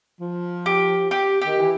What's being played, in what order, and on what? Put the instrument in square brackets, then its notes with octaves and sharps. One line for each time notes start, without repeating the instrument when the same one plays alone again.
[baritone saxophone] F3
[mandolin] G4
G4
[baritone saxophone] D#3 [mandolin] G4
[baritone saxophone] E3